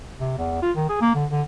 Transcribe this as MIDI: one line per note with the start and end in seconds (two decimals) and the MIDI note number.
0.20 0.33 48
0.38 0.61 40
0.63 0.72 65
0.77 0.87 51
0.90 0.98 68
1.01 1.10 58
1.15 1.26 50
1.31 1.42 50